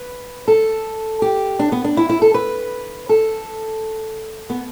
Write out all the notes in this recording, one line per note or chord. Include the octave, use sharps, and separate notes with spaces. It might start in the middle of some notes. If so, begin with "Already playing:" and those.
Already playing: B4
A4
G4
D4
B3
D4
E4
E4
A4
B4
A4
B3